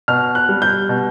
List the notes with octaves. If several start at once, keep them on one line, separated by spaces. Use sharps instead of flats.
B2 F6
F#6
G3
G6
B2